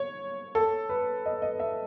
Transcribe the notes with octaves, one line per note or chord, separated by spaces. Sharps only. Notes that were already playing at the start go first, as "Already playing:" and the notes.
Already playing: C#5
A4
B4
D#5
D#5
E5